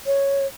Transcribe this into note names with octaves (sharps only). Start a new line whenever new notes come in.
C#5